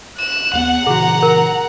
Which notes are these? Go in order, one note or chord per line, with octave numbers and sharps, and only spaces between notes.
F#6 E7
D#2 A#3 B3 F#5
A#2 C#3 E3 F#4 G#4 A#5
A#4